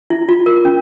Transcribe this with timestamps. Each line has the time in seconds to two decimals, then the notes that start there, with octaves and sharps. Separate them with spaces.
0.10 E4
0.29 F4
0.46 A#4
0.65 C#4